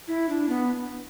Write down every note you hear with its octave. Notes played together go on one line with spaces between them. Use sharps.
E4
D4
B3